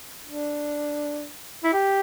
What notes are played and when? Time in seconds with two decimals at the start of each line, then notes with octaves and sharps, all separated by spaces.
0.25 D4
1.64 E4
1.73 G4